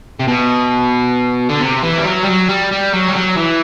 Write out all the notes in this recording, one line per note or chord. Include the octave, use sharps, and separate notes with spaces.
C3
B2
D3
C3
E3
G3
F#3
G3
F#3
G3
G3
F#3
G3
F#3
E3